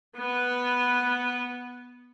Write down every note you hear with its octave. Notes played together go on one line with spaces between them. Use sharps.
B3 B4